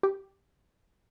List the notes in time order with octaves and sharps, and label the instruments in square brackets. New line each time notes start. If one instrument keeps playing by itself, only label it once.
[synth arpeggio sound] G4